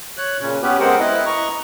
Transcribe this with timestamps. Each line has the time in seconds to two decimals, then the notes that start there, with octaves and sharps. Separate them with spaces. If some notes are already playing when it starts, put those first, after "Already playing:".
0.17 C#5 F#6
0.41 A#2 C#3 C#4
0.62 B3 C#4 G4 B4
0.80 G#3 B3 C4 A#4 C5 F#5
0.99 E4 B4 D#5
1.26 D#5 A#5 C#6